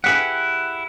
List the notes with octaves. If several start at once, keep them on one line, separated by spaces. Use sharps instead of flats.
E4 G4 G#4 B4 F#5